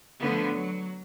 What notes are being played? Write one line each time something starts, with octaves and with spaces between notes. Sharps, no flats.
D3 F3 A3 B3
F#3